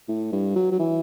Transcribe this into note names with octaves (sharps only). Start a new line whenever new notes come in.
A2
G2
F#3
F#3
E3